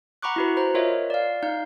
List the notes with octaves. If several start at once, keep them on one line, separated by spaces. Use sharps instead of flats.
F#5 A#5 B5 C#6 D6 F#6
E4 F#4 B4
C5 A#5
F4 A#4 C#5 D#5 E5
D5 F5
D#4 F5 G6